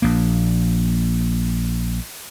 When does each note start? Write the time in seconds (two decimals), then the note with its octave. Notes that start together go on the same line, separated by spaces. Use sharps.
0.02 A#1 A#3